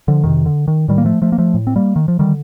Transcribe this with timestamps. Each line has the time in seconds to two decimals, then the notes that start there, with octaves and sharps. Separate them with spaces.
0.08 D3 F3
0.23 F2 C3 D#3
0.46 D3
0.68 D#3
0.88 A2 D#3 G3
0.98 A#3
1.05 F3 A3
1.22 F3 A3
1.32 A#3
1.38 F3 A3
1.54 A2
1.67 C4
1.76 G3 A#3
1.96 D#3
2.08 F3
2.19 D3 D#3 G3